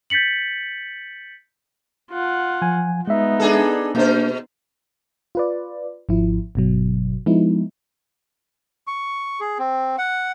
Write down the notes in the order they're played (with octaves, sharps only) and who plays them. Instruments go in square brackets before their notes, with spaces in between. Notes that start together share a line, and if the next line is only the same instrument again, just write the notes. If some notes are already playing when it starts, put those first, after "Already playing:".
[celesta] G6 A6 B6 C#7 F#7
[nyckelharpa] F4 F#5
[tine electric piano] F3 G#5
[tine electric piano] G#3 E5 [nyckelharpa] B3 D#4
[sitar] D4 G#4 A4
[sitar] B2 C5 [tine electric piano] A#3 D4
[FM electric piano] F4 B4 D5
G#1 F3 E4
G1 B2 F#3
F3 G#3 B3 D#4 E4
[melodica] C#6
G#4
C4
F#5